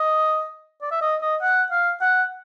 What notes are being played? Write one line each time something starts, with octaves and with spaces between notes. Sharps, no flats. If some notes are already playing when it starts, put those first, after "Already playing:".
Already playing: D#5
D5
E5
D#5
D#5
F#5
F5
F#5